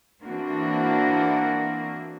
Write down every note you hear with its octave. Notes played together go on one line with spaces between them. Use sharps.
E3 A#3 C4 D4 F#4 A#4